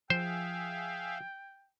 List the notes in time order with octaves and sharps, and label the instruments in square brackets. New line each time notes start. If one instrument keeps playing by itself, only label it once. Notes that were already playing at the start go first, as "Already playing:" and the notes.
[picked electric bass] F3 [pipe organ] G#4 E5 F5 [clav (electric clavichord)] C5 [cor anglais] G5